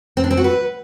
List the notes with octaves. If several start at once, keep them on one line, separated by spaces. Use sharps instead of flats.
C4
D4
C4
F#4
B4